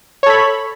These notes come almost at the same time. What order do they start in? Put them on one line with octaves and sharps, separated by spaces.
C#5 A4 B5